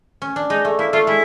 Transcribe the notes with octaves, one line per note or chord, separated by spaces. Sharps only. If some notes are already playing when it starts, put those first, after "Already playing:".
C#4
D4
G#3 D#4
A3
A#3 E4
A3 F4
G#3 E4